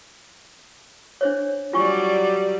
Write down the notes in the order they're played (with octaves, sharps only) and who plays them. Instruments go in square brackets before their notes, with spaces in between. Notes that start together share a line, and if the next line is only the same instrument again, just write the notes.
[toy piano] D4 C5 C#5
[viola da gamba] F#3 G3 D5 [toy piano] F4 G#5 C#6